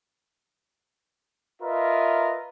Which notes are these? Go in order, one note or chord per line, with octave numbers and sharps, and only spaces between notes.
F4 A#4 B4 D#5 E5